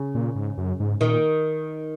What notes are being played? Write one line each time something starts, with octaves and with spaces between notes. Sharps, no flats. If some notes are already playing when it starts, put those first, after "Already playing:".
Already playing: C#3
A#2
G#2
F#2
G#2
A#2 D#3